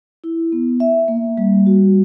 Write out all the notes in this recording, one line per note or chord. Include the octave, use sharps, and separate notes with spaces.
E4
B3
E5
A#3
G3
F#4